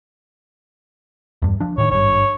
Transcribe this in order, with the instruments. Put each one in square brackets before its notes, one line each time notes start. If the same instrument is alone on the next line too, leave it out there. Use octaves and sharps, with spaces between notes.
[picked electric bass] E2 G2
F3 D4
[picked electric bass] A2 D#3 [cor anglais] C#5
[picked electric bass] G#1 G2 [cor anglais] C#5